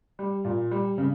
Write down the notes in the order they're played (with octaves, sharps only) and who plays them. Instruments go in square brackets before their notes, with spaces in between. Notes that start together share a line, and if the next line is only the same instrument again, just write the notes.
[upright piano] G3
A#2
G3
C#3